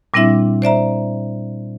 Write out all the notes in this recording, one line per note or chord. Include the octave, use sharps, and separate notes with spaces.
A#2 G3 C4 D4 E4 E5
C5 D5 E5 A#5